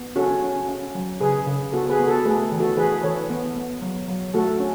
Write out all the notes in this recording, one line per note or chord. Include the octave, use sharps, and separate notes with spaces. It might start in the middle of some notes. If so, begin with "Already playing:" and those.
Already playing: B3
C#4 F#4 A4
C#4
C#4
F#3
C#3 G#4 B4
C#3
B3 F#4 A4
G#4 B4
B3
F#4 A4
A3 G#4 B4
E3
F#4 A4
E3 G#4 B4
E3 A4 C#5
B3
B3
F#3
F#3
A3 F#4 A4
C#4